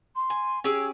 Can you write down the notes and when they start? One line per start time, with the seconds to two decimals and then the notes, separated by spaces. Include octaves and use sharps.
0.15 C6
0.30 G#5
0.64 C#4 G4 G#4 E6